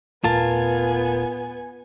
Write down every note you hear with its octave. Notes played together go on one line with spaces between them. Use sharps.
D#1 A#2 A3 B3 F4 A#4 G#5 A5